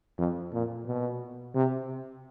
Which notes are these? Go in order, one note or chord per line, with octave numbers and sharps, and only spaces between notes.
F2
A#2
B2
C3